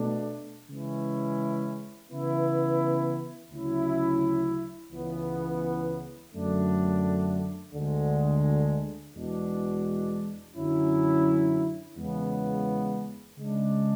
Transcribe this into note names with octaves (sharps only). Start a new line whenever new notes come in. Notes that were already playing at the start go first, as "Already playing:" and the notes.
Already playing: B2 A3 D4
C#3 E3 G#3 C#4 E4
C#3 E3 B3 E4
D2 C#3 F#3 C#4 E4
C#2 C#3 E3 B3
F#2 D3 A3 D4
D2 D3 G#3
E2 B2 G#3 D4
F#2 D3 F#3 C#4 E4
E2 C#3 G#3 B3
C#3 G#3 D4